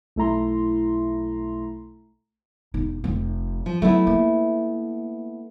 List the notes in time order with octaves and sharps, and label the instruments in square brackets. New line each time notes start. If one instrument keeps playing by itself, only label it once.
[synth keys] B1 A3 E4 A#5 C6
[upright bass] E1 D#4
F1 C4
[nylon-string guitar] F3
[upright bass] F#3 [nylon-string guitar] A3 B3 E4
[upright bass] A#3